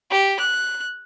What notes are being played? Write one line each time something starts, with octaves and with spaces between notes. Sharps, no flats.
G4
F#6